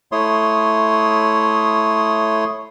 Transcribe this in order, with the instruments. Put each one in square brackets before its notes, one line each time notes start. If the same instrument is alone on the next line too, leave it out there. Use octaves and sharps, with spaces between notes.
[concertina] A3 E4 C#5 C6 D#6